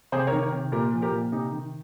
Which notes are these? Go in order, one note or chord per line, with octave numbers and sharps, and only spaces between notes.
C3 G#4 C5
A#4 C#5
D#3
A#4 C#5
C3
A#2 G4 A#4
F3
G4 A#4
A#2
C3 D#4 G4
D#3